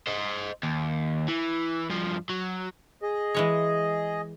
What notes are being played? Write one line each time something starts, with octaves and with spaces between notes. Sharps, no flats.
C5 D#5
D#2
E3
G2 F3
F#3
G#4 D#5
E3 G#3 C#5